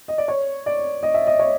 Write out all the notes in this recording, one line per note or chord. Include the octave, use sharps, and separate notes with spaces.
D#5
D5
C#5
D5
D#5
E5
D#5
C#5